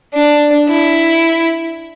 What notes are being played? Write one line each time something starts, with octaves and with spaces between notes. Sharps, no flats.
D4
E4